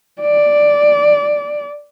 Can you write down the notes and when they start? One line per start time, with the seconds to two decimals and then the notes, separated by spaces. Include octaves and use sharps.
0.21 D5